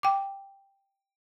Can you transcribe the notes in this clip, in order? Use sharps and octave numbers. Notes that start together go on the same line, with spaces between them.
G5 D6